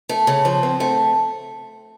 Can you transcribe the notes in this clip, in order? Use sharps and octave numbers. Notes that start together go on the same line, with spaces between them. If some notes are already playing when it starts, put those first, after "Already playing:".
A3
C#3
F3
C4
A3